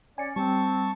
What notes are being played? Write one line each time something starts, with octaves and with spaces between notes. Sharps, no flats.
C#4 D5 G#5 C#7
G3 C4 A5 C#6